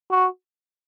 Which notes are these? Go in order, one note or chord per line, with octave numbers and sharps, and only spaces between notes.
F#4